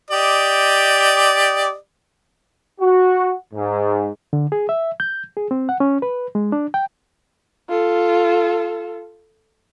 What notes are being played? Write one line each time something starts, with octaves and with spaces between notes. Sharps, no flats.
G4 D5 D#5
F#4
G#2
D3
G#4
E5
G6
G#4
C4
F#5
C#4
B4
G#3
D4
G5
F4 A4